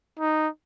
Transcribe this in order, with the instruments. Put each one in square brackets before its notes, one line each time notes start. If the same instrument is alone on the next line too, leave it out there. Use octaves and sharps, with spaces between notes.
[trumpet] D#4